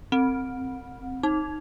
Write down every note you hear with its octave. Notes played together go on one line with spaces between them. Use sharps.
C4
D#4